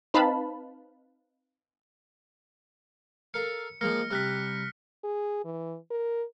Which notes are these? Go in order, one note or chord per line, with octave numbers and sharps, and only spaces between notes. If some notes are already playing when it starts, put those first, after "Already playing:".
C4 D#4 B4 F5 A5 B5
A4 A#4 F5 C#7
F3 G#3 A#3 F6 A#6 C#7
C3 G3 F6 F#6 B6
G#4
E3
A#4